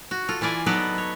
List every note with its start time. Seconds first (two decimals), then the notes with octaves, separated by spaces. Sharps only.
0.11 F#4
0.29 F4 A4
0.41 E3 E4 F4 D5 G#5
0.66 F#3 B3 D#4 A4 B4 D5
0.98 C#5